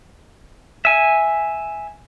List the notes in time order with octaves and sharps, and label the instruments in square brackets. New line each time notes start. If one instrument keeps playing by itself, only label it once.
[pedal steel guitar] E5 G#5